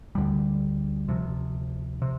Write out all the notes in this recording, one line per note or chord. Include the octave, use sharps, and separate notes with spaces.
D2 D3 G3
D2 C3 F3
C3